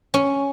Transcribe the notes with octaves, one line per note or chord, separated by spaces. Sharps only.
C#4